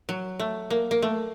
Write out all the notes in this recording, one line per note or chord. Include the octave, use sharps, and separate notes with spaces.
F#3
A3
A#3
A#3
A3